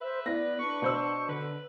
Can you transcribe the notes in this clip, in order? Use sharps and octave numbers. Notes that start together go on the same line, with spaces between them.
B4 C5 E5
B3 E4 D5 A#6
D4 C#6
B2 C5 E6
D3 B4